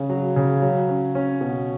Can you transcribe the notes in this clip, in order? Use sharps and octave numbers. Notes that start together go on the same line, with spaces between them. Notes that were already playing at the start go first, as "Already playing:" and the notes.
Already playing: C#3 C#4
F#3
C#3
F#3
C#4
C#4
B2